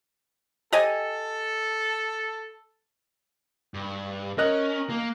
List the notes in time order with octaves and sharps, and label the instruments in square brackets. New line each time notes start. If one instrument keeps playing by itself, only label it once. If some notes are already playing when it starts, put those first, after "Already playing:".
[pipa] G4 D#5 G#5 [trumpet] A4
[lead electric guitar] G2
[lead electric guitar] C#4 [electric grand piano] A#4 D#5 F#6
[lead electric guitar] A#3